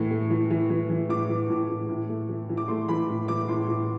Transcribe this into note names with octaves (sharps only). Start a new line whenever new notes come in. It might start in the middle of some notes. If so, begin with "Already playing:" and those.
Already playing: A2 E3 A3
A3
E3
E3
E3
E3
A2 D6
E3
A2
A2
A2
A3
E3
E3
D6
A3 C6
E3 B5
A2
E3 D6
A2 C6
A2